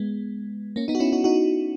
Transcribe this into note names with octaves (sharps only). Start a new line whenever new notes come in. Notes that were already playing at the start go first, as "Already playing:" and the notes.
Already playing: G#3 B3
A#3 C#4
B3 D#4
F#4
C#4 E4
D#4 F#4
D#4 F#4